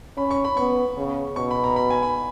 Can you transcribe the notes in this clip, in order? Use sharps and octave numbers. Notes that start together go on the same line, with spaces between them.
C#4 B5
C#6
B5
B3 C#6
C#3
B2 C#6
B5
A#5
B5
G#5
B5